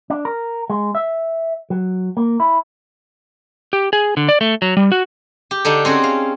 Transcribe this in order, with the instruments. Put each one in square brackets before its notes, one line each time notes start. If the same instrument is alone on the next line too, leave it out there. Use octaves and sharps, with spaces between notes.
[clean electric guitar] D4
A#4
G#3
E5
F#3
A#3
E4
[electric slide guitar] G4
G#4
D3
D5
A3
F#3
G3
F#4
[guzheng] G4
D3 D4 D#4 G4
C4 C#4 F#4 G#4
F5